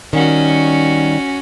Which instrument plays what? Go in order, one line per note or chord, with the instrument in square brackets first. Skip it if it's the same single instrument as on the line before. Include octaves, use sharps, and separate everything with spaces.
[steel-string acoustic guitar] D#3 G3 [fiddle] C#4 F#4